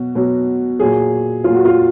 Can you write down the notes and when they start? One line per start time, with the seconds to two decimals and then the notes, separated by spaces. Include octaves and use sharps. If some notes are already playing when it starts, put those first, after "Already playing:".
Already playing: B2 F#3 F#4
0.15 B2 F#3
0.79 A#2 F#3 G#4
1.44 A#2 F#3 F4
1.55 F#4
1.65 F4